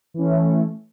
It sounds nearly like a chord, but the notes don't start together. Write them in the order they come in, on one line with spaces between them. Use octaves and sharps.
E3 C#4 A3